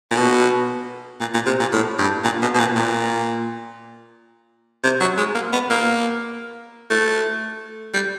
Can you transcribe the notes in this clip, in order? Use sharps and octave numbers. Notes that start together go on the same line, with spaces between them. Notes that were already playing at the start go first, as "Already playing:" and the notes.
A#2
B2
A#2
A#2
C3
A#2
A2
G2
A#2
B2
B2
A#2
A#2
C3
F#3
G#3
A#3
B3
A#3
A3
G3